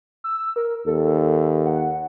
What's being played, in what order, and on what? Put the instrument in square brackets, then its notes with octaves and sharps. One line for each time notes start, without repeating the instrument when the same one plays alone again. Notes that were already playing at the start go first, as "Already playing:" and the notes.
[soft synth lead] E6
A#4
[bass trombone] D#2 [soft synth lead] A4
[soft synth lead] F#5